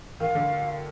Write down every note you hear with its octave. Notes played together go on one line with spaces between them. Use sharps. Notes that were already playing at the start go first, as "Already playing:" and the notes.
D#3 F5
D3